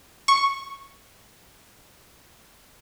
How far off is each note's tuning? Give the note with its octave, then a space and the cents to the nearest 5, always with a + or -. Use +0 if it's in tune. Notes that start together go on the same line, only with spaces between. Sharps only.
C#6 -5